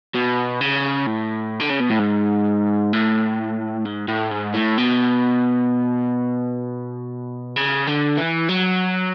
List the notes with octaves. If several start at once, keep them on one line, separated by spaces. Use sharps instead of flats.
B2
C#3
A2
D3
C#3
B2
A2
G#2
A2
G#2
A2
G#2
A2
B2
C#3
D3
E3
F#3